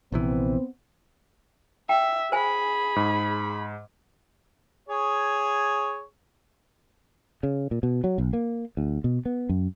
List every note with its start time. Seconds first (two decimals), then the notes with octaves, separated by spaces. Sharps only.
0.12 A#1 C3 E3 B3 C4
1.89 E5 G5
2.32 G#4 C5 G#5 B5
2.96 G#2
4.89 G#4 C#5
7.43 C#3
7.71 A#2
7.83 B2
8.04 F#3
8.18 B1
8.33 A#3
8.77 D2
9.04 B2
9.25 B3
9.49 F#2